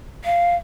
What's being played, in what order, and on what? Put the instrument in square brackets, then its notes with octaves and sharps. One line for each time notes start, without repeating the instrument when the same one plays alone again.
[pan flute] F5